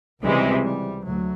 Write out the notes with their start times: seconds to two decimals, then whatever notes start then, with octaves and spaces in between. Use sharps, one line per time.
0.23 C#2 C3 E3 G3 G#3
0.64 G3
1.05 D2 F#3